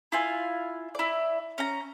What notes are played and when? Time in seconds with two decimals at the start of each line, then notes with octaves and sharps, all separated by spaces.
0.12 E4 F4 G#5
0.95 E4 D5
1.58 C#4 A#5